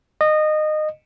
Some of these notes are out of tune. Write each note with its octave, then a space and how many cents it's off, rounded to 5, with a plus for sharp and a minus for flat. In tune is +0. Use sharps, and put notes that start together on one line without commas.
D#5 -20